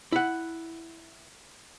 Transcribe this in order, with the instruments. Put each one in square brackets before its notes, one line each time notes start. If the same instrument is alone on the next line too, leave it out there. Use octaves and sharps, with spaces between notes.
[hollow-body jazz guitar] E4 F#5